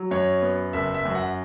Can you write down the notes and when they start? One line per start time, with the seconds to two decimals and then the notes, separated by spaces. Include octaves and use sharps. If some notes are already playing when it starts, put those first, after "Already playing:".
Already playing: F#3
0.11 F#2 C#5
0.42 B3
0.73 F#1 E5
0.95 E5
1.05 F#2
1.15 F#5